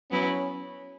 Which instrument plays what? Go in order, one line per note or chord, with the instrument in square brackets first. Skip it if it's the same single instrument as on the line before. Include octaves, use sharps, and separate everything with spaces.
[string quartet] F#3 B3 E4 [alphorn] C#4